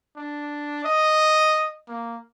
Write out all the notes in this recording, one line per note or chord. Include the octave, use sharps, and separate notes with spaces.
D4
D#5
A#3